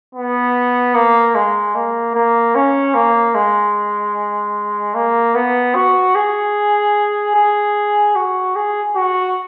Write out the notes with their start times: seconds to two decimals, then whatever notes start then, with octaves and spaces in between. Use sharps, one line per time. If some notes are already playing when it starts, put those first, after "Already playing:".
0.15 B3
0.95 A#3
1.35 G#3
1.75 A#3
2.15 A#3
2.55 C#4
2.94 A#3
3.35 G#3
4.94 A#3
5.35 B3
5.75 F#4
6.15 G#4
7.35 G#4
8.16 F#4
8.56 G#4
8.95 F#4